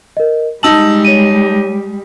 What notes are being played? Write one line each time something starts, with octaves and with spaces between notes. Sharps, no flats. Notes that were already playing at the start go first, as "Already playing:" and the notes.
A#4 D#5
G3 G#3 D#4 A5 E6 F#7
C#5 D#7